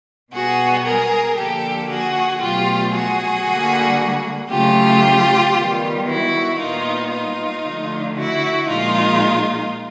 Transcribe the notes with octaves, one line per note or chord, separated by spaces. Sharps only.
B2 G3 B3 F#4 G#4
G#4 A#4
D3 F3 A#3 G4 A4
F#4 G#4
B2 F#3 A3 F4 G4
F#4 G#4
D3 G3 A#3
C#3 F#3 A3 F4 G4
D#3 G3 B3
E4 F#4
A#2 G3 B3 D#4 F4
D#4 F4
D3 F3 A3
E4 F#4
A#2 F3 G#3 D#4 F4